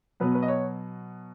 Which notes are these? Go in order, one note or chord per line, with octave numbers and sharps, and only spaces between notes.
B2 F#3 B3 B4
B4
D#5
C#5